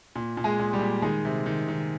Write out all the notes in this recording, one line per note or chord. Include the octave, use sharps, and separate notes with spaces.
A#2
A#2
G#3 G#4
A#2
G3 G4
A#2
D#3 G#3 G#4
C3
D#3
D#3